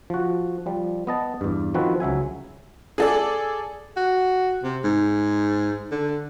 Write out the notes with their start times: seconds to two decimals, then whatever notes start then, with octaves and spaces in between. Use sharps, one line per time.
0.10 F3 F#4
0.66 F3 G3
1.07 B3 D#5 A5
1.41 E2 G2
1.74 D#3 F3 C4 F#4 B4
2.00 C#2 F#3 E5 G#5
2.98 G#4 A4 D5
3.97 F#4
4.64 C3
4.84 G#2
5.91 D3